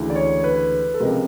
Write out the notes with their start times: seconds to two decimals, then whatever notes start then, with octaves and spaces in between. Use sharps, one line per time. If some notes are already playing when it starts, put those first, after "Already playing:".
Already playing: D2 C#3 E3 G#3
0.10 D5
0.15 C#5
0.44 B4
0.94 A4
1.00 C#2 C3 F3 G#3 A#4